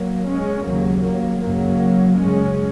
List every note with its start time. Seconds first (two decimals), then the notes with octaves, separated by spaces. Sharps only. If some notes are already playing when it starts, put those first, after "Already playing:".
Already playing: F#3 A#3
0.28 G#3 C#4
0.67 D#2 C#3 F#3 A#3
1.05 F#3 A#3
1.43 F#2 C#3 F#3 A#3
2.19 F#2 C#3 G#3 C#4